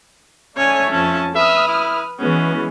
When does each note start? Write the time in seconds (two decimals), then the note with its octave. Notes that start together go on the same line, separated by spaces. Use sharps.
0.57 A3 C#4 C#5 D5 G#5
0.90 F2 F3 C#4 A5
1.35 B4 E5 D#6 F6
1.68 E4
2.20 E3 G#3 B3 C#4 F#4